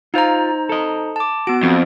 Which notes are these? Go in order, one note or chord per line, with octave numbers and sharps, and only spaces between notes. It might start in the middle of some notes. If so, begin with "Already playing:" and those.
D#4 F4 C5 F5 A#5
A4 D#5
A5 D6
B3 F#4 D7
F2